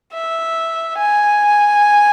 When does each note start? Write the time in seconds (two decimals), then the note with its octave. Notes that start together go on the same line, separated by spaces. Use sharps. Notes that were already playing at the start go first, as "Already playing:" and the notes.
0.14 E5
0.98 G#5